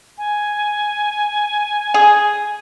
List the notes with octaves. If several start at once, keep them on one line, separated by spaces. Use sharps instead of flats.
G#5
G#4